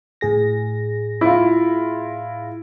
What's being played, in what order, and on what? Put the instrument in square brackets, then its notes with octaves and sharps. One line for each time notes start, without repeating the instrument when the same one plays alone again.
[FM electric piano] A2 G#4 A#6
[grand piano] E4 F4